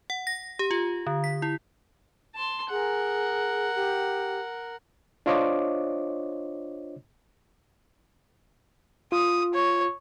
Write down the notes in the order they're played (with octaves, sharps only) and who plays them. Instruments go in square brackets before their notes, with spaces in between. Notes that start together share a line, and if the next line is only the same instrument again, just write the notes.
[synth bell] F#5
A#6
G4
F4
D3
B6
E4
[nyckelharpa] A5 C6
[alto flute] G#4 [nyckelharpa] A#4 F#5
[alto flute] G4
[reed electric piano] D4 F4 C5 C#5 D#5 D6
[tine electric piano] F4 [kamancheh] D#6
[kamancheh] C#5